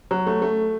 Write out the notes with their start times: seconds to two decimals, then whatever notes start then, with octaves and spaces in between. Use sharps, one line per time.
0.11 F#3
0.27 A3
0.42 A3